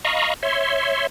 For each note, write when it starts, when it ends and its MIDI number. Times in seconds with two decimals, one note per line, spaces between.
0.05 0.34 75
0.05 0.34 77
0.05 0.34 82
0.05 0.34 83
0.05 0.34 85
0.43 1.07 73
0.43 1.07 76
0.43 1.07 84